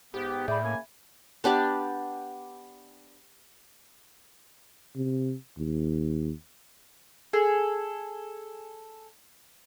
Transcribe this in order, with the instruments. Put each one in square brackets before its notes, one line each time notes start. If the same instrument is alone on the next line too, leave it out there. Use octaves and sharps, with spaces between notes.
[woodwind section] G#2 B3 [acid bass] G4
[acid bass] A2 [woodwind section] G#4 D5 G5 [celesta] E5 B5
[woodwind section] C#3 A#3 G#5
[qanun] B3 D4 G4 D5
[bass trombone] C3
D#2
[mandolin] G#4 A4